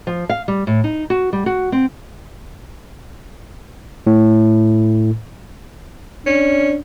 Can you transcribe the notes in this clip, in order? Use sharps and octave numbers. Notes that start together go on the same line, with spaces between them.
F3
F5
G3
A2
D#4
F#4
G3
F#4
C4
A2
C#4 D4